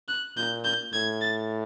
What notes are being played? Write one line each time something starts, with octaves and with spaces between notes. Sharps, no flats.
F#6
A#2 G6
G6
A2 G#6
A6